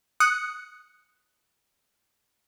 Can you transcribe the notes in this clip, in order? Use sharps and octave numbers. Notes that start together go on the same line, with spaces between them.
D#6 F#6 C#7